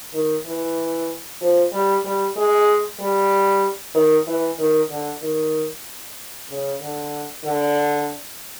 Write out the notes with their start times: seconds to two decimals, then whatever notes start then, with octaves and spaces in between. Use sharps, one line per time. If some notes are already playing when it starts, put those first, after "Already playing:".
0.14 D#3
0.45 E3
1.41 F3
1.73 G3
2.04 G3
2.37 G#3
3.00 G3
3.95 D#3
4.27 E3
4.59 D#3
4.90 D3
5.22 D#3
6.49 C#3
6.81 D3
7.44 D3